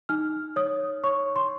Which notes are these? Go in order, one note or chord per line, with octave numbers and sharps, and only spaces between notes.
D#4 F6
C#5 D#6
C#5 C#6
C6